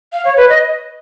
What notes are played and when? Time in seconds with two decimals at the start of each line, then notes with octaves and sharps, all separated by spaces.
0.13 F5
0.25 C#5
0.37 B4
0.49 D#5